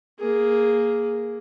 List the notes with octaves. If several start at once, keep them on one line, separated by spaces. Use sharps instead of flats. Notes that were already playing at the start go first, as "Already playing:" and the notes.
A#3 G#4